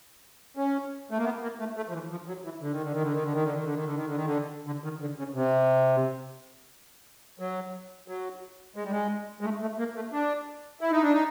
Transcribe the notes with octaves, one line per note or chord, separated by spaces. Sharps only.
C#4
A3
A#3
B3
A#3
A3
A3
F3
E3
F3
F#3
E3
D3
D#3
D3
D#3
D3
D#3
D3
D#3
D3
D#3
D3
D#3
D3
D#3
D3
D#3
D3
D3
D#3
D3
C#3
C3
F#3
F#3
G#3
G3
G#3
G#3
A3
A3
A#3
A3
D4
E4
D#4
D4
D#4